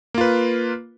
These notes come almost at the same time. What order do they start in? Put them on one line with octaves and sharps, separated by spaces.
A#3 F4 B4